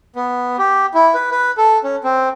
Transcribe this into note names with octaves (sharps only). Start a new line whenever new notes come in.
B3
G4
E4
B4
B4
A4
C#4
C4